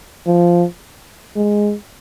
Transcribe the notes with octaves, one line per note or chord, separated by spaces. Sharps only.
F3
G#3